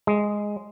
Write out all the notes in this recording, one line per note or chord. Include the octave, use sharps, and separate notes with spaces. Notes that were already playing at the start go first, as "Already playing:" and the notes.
G#3